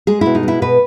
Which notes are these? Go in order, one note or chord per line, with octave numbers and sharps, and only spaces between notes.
G#3 G#4
B2 E4
D#4
G#3 E4
B2 B4